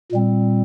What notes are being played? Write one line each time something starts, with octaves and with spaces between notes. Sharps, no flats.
A#2 G3 C4